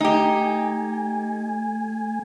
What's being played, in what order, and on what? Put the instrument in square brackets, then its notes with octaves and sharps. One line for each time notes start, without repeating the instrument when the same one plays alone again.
[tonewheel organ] A3 G#5 [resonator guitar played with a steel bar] D#4 G4